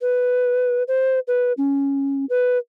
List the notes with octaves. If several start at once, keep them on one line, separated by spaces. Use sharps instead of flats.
B4
C5
B4
C#4
B4